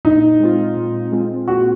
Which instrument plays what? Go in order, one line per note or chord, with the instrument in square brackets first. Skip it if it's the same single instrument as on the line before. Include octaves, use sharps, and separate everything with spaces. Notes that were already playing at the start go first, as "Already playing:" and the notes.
[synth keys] A#2 [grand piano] D#4
[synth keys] G#3 C4 F4
A#2
G#3 C4 F4
[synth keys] A#2 [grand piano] F#4